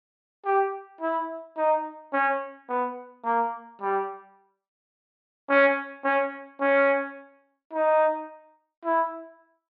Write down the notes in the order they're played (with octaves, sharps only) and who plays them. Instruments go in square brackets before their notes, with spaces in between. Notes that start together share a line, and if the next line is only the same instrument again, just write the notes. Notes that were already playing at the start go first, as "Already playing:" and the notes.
[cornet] G4
E4
D#4
C#4
B3
A#3
G3
C#4
C#4
C#4
D#4
E4